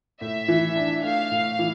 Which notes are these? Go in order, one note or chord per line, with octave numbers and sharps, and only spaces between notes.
A2 E5
E3
D4
A3 F5
A2
E3